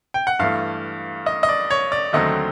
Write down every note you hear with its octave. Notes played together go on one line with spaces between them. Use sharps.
G5
F#5
G2 E3 A3 F5
D#5
D#5
D5
C#5
D5
D#2 D3 F#3 A3 C4 D#5